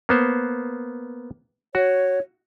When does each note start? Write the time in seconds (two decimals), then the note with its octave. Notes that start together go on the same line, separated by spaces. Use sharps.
0.09 A#3 B3 C5
1.75 F#4 C#5